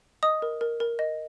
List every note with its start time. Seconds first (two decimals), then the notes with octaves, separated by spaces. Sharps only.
0.23 D#5 D#6
0.42 A#4
0.61 A#4
0.80 A#4
0.99 D#5